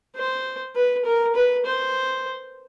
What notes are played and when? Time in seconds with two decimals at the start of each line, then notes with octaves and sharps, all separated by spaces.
0.16 C5
0.75 B4
1.05 A#4
1.35 B4
1.65 C5